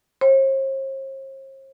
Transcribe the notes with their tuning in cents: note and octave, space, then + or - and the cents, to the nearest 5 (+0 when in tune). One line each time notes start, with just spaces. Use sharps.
C5 +45